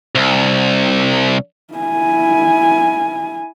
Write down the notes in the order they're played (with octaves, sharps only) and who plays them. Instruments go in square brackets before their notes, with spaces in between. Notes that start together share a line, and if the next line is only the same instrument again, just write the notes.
[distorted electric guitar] C2
[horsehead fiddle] E4 G#5